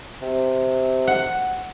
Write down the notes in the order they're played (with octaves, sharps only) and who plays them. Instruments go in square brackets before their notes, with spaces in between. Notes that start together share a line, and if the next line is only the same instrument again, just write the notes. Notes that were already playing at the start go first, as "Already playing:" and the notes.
[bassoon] C3
[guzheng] F#5